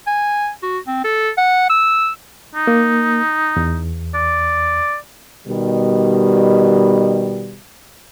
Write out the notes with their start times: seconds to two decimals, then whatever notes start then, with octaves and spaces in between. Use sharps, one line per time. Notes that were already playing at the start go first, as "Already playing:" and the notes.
0.07 G#5
0.63 F#4
0.87 C4
1.04 A4
1.38 F#5
1.70 E6
2.55 D#4
2.67 A#3
3.57 E2
4.14 D5
5.47 B2 D#3 G3